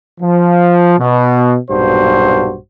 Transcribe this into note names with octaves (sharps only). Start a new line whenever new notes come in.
F3
B2
B1 G2 A#2 F#4 C5